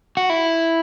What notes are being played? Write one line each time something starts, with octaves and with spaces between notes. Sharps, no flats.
F#4
E4